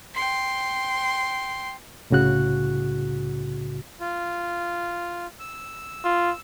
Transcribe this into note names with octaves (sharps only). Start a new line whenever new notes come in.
G5 C6
C2 A2 C#3 F#4 F#6
F4
E6
F4